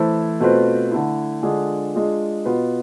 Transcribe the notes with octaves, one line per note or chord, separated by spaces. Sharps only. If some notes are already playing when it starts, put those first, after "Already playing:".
Already playing: E3 A3 E4 A4 C5
B2 A3 C4 F4 B4
D3 A3 E4
D3 G#3 D4 F4 G#4
G#3 D4 F4 G#4
B2 B3 F4 B4